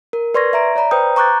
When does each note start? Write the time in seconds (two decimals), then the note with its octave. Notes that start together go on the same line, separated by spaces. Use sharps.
0.13 A#4
0.34 B4 D5 C6 C#6 G#6 A#6
0.53 E5 A#5 D7
0.75 C#5 D5 A#5 B5
0.91 B4 C5 G5 A#5 D#6 G6
1.16 A#5 C#6 D6 F#6 G6 A6